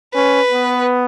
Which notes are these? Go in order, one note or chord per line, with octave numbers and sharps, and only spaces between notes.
C#4 B4
B3